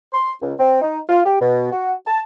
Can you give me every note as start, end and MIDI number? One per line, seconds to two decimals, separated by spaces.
0.13 0.33 84
0.41 0.53 37
0.59 0.80 60
0.81 0.99 63
1.08 1.21 65
1.25 1.37 67
1.40 1.67 47
1.71 1.93 66
2.06 2.21 81